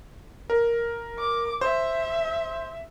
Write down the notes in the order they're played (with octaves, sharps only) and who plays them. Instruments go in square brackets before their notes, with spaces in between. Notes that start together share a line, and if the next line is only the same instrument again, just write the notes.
[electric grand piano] A#4
[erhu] D6
[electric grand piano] C5 [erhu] E5